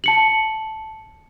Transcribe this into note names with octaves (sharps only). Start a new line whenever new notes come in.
A5 C#7 F#7